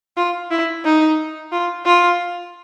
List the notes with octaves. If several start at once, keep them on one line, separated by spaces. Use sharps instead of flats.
F4
E4
D#4
F4
F4